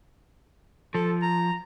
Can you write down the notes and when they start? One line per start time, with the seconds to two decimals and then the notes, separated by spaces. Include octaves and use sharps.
0.95 F3 A4
1.22 A#5